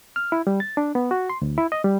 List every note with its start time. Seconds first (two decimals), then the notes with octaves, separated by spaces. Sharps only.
0.16 F6
0.32 E4
0.47 G3
0.60 A6
0.77 D4
0.95 B3
1.11 F#4
1.30 C6
1.42 D2
1.58 E4
1.72 D#5
1.84 G3